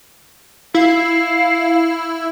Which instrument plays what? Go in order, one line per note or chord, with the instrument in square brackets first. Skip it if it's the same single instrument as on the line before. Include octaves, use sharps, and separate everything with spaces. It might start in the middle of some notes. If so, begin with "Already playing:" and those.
[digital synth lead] E4 [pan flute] F5